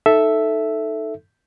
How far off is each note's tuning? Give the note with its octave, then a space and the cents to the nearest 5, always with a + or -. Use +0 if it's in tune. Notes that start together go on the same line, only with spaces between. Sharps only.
D#4 +0 A4 +0 E5 +0